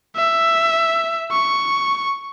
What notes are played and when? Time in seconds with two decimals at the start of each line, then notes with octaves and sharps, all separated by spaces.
0.16 E5
1.31 C#6